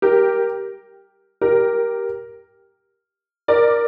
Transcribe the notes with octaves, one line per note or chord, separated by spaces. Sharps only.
G4 A#4
G4 A#4
A#4 D5